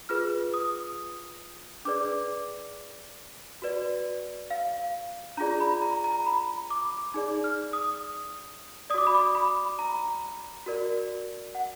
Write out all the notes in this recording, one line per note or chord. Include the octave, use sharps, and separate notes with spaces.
F4 G#4 B4 F6
D#6
D4 G#4 B4 D5 D6
F#4 B4 D5
F5
D4 F4 G#4 D5 A#5
B5
A#5
A#5
B5
D6
D#4 G#4 D5
F6
D#6
F#4 D5 D6 D#6
B5
D6
B5
A#5
F#4 A#4 D5
F#5